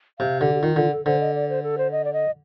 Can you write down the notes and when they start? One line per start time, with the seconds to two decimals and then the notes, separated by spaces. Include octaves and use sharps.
0.19 C3 F5
0.41 D3 G4
0.55 G4
0.62 D#3 F4
0.76 D3 F4
0.91 A4
1.06 D3 C5
1.20 D#5
1.35 D5
1.49 C5
1.63 A4
1.78 C5
1.92 D#5
2.05 D5
2.13 D#5